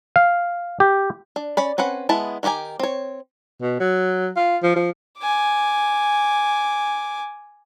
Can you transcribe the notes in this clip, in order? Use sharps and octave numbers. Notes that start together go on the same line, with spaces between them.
F5
G4
D4
C#4 D5 B5
C4 C#4 B4 F#5
G#3 B3 E4 A5
D#3 F#4 G4 A#4 G#5
C4 C#5
B2
F#3
F4
F3
F3
G#5 D6